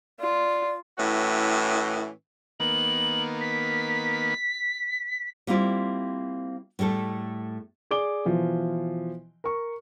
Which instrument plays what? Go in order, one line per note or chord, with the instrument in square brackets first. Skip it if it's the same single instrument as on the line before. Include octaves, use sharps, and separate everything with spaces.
[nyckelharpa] F4 [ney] D5
[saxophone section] A2 E3 C#4 F#4
[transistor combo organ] D#3 A#3 B3 [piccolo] F#7
[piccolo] B6
[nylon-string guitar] G3 A#3 C4 E4 F4
A2 G3 A3 A4
[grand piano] G#4 D5 D6 G7
B2 E3 F3
A#4 C#6